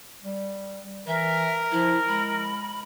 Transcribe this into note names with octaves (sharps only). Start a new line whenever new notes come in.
G3
E3 A#4 E5
F3 E4
G#3 B5